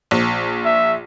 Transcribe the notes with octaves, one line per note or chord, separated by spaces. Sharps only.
A#1
E5